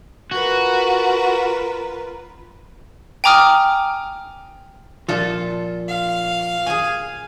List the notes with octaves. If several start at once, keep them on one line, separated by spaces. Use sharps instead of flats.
F4 F#4 A#4 B4
G5 G#5 A#5 D6 D#6 F6
A#2 F3 F4 A4
F5
G#4 G#5